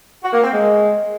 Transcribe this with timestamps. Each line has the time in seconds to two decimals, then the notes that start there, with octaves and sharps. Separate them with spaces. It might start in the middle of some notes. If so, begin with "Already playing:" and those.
0.23 F#4
0.32 A#3
0.42 C4
0.52 G#3